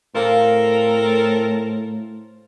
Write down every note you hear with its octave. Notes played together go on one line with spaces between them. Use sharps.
A2 C4 A4 A#4 C5 F5